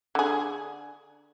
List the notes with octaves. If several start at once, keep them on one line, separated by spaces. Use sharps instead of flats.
D3 G#4